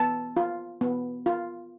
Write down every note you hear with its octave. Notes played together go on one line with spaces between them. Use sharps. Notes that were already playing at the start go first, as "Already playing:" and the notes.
Already playing: B3 A5
F4
B3
F4